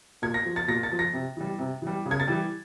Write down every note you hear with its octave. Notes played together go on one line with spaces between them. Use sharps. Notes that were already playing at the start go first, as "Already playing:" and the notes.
A#2 G#6
A#6
F3
A6
A#2 A#6
A6
F3
A#6
C3
E3 G3
C3
E3 G3
C#3
G#6
A6
E3 G3